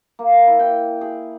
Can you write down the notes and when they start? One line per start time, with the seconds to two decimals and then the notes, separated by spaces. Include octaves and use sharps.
0.19 A#3
0.47 E4
0.59 G5
1.01 G#4